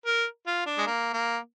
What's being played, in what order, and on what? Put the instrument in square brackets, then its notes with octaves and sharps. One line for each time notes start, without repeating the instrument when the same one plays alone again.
[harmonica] A#4
F4
D4
G#3
A#3
A#3